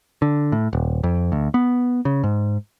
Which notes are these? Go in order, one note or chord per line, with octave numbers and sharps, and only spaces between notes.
D3
A2
D#1
F2
D2
B3
C#3
G#2